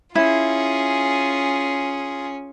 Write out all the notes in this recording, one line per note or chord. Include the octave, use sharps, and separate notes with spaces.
C#4 E4 F4 G#4